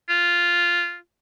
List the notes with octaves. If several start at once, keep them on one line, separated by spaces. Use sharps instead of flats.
F4